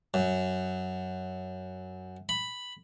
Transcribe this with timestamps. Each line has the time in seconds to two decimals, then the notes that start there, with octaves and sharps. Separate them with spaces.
0.14 F#2
2.29 B5